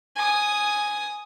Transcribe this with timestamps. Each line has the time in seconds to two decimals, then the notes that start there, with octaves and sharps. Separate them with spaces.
0.16 G#5 D#6